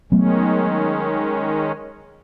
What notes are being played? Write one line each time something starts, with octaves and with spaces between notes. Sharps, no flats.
D#3 F#3 G#3 A3 B3 C#4